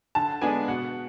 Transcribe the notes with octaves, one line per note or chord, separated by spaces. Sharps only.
D3 A5
G#3 B3 D4 G#5
B2 F#5